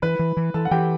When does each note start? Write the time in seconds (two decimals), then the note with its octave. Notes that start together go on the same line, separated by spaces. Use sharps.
0.02 E3 B4 B5
0.19 E3
0.37 E3
0.54 E3 A4 A5
0.65 F#5
0.71 E3 G4 G5